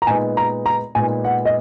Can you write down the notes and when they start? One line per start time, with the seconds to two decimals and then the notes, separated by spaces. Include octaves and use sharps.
0.02 A#5
0.07 A#2 G#3 B3 D#4 G#5
0.37 A#5
0.66 A#5
0.95 A#2 G#3 B3 D#4 G#5
1.24 F#5
1.45 D#5